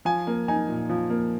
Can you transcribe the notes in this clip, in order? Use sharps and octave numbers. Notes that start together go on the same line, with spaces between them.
F3 G#5
A#3
D#4 G#5
A#2
F3
A#3